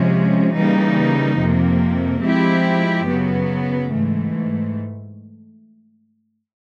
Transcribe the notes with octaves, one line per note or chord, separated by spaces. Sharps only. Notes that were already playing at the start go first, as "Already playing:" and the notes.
Already playing: C3 F3 G#3 C#4
C#3 E3 G3 A#3 D#4
F2 C3 F3 A#3
F3 G#3 C4 E4 G4
F#2 C#3 F#3 B3
G#2 E3 A3